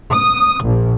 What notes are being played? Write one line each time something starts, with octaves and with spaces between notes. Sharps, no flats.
D#6
A#1